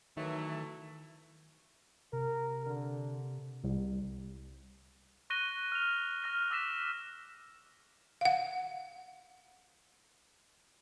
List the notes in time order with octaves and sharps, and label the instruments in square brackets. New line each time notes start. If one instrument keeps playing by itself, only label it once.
[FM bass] D#3 [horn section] E3 F#3 A3
[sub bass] C3 [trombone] A#4
[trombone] D3
[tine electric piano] C2
[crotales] C#6 F#6 A#6 D#7 G7
F6 F7
F6 A#6 G7
D6 E6 F#6 A#6 B6 E7
[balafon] F5 F#5